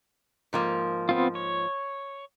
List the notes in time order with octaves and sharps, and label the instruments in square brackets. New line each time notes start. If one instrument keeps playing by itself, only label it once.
[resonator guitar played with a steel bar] G#2 F3 A#3
[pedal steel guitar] B3 C4 F4
C#5